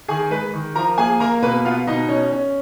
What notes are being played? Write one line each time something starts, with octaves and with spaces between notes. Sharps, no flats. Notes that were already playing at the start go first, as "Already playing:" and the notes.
D#3 G#4 G#5
G#3 B4 B5
D#3
F3 A#4 A#5
A#3 G#4 G#5
A#3 A#4 A#5
B2 B4 B5
B3 F4 F5
B2 D#4 D#5
C#4
C#4